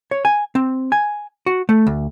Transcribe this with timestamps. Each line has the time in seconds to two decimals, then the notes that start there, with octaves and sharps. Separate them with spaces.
0.11 C#5
0.25 G#5
0.55 C4
0.92 G#5
1.46 F#4
1.69 A3
1.87 D2